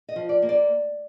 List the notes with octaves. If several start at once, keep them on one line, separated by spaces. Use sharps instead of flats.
D#5
F3
D5
A#3
D5